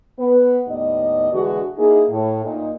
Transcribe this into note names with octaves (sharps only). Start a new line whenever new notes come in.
B3 B4
D#2 A2 B3 D#4 D5 D#5
B2 D3 E3 G#3 F#4
A#3 D#4 E4 G#4
A2
A#2 D#4